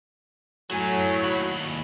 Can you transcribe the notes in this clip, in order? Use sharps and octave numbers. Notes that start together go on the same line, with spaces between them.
A2 F#3 F#4 G#5
D#2 B5